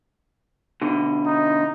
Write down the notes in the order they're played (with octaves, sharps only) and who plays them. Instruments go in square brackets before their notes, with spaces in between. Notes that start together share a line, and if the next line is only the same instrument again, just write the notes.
[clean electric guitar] B2 D3
[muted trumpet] D#4